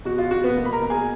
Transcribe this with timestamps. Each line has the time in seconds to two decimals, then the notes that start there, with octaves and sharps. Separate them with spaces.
0.05 B2 F#4
0.18 F4
0.31 B2 F#4
0.44 B3 B4
0.57 A#3
0.65 B5
0.73 A#4 A#5
0.82 B2
0.90 G#4 G#5